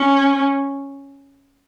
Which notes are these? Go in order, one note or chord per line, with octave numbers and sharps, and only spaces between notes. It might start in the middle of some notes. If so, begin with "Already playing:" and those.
Already playing: C#4